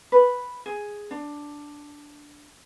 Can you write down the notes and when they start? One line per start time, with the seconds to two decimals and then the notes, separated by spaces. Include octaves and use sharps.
0.12 B4
0.66 G#4
1.11 D4